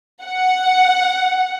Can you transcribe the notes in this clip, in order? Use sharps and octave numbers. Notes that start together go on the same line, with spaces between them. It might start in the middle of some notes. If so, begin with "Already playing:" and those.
F#5